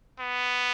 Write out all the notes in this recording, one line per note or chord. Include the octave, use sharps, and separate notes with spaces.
B3